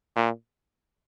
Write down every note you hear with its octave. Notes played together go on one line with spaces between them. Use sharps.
A#2